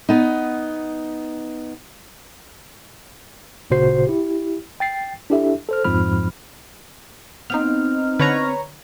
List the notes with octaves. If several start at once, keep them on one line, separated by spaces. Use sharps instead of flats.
B3 D#4
G#1 A#2 C#3 F#4 C5 C7
E4 G4
G5 A6 C7
D4 E4 G4 A4 E5
A4 C5 F6
F2 G#2 F3 B5 F6
B3 C4 D#4 F5 F6
D3 B4 C#5 A#5